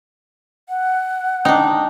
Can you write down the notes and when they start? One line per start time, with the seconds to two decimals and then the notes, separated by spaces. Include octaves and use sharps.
0.69 F#5
1.45 D4 D#4 G5